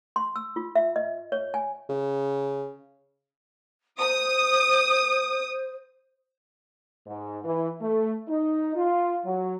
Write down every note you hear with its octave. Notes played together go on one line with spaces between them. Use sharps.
C6
E6
F4
E5
D#5
C#5
G#5
C#3
C5 D#6
G#2
E3
A3
D#4
F4
F#3